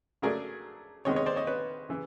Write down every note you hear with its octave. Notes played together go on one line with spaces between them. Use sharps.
C#3 F#3 A3 D4 G#4 A#4
C3 D#3 G#3 B3 C#5 D#5
C#5 D#5
C5 D5
C#5 D#5
B4 C#5
C#3 E3